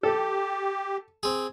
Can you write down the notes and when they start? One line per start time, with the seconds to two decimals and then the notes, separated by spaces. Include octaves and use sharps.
0.03 G4 A4
1.23 C4 G#4